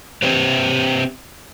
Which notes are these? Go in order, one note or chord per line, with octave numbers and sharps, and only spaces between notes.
C4 G4 B4 C5